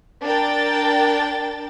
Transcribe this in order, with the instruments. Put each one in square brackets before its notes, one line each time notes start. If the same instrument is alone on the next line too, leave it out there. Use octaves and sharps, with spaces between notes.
[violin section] D4 A#4 G5 A6